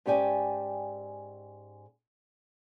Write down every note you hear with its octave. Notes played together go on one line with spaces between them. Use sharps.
G#2 C#4 G4 D5 G#5